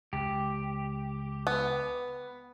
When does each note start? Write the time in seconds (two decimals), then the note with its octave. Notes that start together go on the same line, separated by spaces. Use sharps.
0.13 C#2 G4
1.47 B3